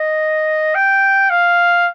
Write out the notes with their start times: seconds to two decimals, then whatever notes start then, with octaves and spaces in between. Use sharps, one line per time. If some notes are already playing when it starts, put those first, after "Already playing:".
Already playing: D#5
0.75 G5
1.30 F5